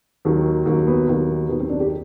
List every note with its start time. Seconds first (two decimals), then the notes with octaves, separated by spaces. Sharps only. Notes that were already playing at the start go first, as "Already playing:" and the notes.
0.25 D#2 D#3 F#3
0.66 D#2 D#3 F#3 A#3
0.87 B3
1.08 D#2 D#3 F#3
1.49 D#2 D#3 F#3 B3
1.60 C4
1.69 D4
1.80 G4